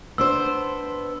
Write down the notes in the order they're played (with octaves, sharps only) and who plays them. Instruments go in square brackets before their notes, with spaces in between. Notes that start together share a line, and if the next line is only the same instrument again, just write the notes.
[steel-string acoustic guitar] B3 D4 C5 [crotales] E6